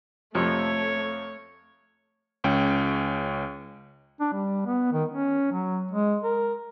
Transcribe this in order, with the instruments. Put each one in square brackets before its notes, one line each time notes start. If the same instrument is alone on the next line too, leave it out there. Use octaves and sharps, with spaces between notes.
[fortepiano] F2 C3 F3 [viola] A3 [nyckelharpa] C#5
[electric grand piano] C#2 C#4 G5
[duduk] D4
G3
B3
D#3
C#4
F#3
G#3
A#4